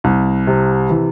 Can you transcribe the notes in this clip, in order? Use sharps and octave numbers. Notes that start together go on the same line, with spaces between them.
C2
C3
E3